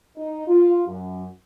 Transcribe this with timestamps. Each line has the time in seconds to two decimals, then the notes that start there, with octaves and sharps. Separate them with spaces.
0.17 D#4
0.48 F4
0.88 F#2